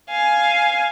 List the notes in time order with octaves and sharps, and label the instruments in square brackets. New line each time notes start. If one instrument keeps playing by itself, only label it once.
[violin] F5 G#5